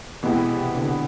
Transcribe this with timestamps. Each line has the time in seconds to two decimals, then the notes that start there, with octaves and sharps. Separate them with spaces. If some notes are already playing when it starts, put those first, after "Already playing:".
0.23 B2 E3 G#3 B3 E4 G4
0.49 C3
0.76 D3